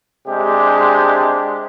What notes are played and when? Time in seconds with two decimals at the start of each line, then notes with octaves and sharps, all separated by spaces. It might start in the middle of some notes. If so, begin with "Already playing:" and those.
0.28 C3 G#3 D4 G4